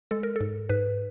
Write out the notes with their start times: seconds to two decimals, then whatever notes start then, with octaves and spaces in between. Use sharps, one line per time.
0.11 G#3 A4
0.23 A#4
0.36 G#2 A4
0.69 G#2 B4